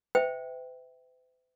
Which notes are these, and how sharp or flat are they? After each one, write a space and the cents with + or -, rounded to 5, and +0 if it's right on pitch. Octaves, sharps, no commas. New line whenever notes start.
B4 +45 E5 -15 G5 +0